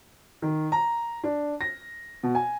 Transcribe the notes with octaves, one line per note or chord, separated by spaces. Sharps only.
D#3
A#5
D4
A#6
B2
G#5